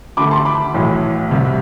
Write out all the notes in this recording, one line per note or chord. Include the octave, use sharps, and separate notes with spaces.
D2 D3 A3 B5 D6
A5 C6
B5 D6
B1 A2 E3
C2 C3 G3